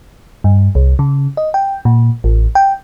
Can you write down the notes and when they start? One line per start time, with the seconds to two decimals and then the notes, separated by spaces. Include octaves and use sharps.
0.44 G2
0.75 C2
0.99 C#3
1.37 D#5
1.54 G5
1.85 A#2
2.24 A1
2.55 G5